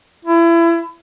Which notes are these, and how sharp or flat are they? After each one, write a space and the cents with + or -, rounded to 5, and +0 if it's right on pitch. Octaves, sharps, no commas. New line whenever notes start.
E4 +30